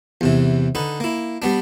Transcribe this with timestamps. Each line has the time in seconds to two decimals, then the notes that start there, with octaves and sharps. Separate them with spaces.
0.21 E2 C3 E3
0.75 D3 D#4 B4
1.00 A#3 E4
1.42 G3 B3 D4